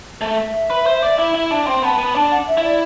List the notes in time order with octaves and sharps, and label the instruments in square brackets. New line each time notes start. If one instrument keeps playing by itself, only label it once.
[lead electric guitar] A3 [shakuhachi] E5
[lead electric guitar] B4
C5
D5
E4
E4
[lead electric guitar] D4 [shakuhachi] E5
[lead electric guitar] C4 [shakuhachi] G5
[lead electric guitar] B3 [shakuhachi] A5
[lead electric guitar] B3
[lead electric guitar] D4 [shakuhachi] A5
[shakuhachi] F#5
E5
[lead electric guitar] E4
[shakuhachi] D5